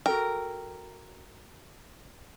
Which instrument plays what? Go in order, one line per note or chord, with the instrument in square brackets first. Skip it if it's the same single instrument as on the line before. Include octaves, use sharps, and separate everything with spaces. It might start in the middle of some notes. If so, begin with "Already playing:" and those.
[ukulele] F#4 A4 G5 [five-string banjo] A#4